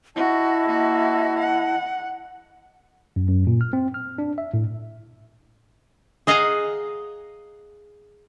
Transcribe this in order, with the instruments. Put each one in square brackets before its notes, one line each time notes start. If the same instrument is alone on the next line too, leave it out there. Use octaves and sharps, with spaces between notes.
[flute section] E4 D#5 A5 [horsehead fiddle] F#4
[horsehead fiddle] A#3 F#4
F#5
[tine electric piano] F#2
F#2
A#2
F6
C4
F6
D4
E5
A2
[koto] G#4 D#5 F5 F#5 G#5 A#5